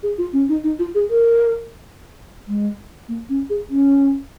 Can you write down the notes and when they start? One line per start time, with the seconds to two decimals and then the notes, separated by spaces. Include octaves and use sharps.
0.03 G#4
0.18 F4
0.33 C#4
0.49 D#4
0.64 D#4
0.79 F4
0.95 G#4
1.10 A#4
2.47 G#3
3.08 A#3
3.29 C#4
3.50 G#4
3.70 C#4